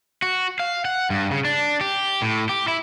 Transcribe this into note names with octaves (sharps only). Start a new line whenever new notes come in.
F#4
F5
F#5
G2
C#3
D4
G4
A2
G4
E4